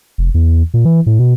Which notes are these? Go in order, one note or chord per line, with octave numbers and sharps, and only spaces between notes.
F1
E2
A#2
E3
A2
B2